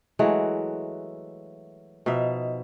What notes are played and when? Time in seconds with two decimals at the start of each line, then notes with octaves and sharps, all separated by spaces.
0.19 E3 F#3 G#3 A3
2.06 B2 F3 D#4 E5